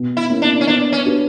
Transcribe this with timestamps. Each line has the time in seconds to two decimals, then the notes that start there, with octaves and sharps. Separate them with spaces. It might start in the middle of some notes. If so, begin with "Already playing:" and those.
Already playing: B2
0.17 E4
0.30 A#3 C#4 E4
0.42 D4
0.61 C#4
0.67 B3 D4
0.93 C#4
1.05 D4 F#4 B4